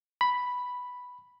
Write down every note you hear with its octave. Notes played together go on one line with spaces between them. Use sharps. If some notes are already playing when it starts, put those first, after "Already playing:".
B5